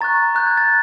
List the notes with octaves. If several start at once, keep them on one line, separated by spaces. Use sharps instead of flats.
A#5 C#6 F#6 A6
A#5 C#6 F#6 G6
G#6
A6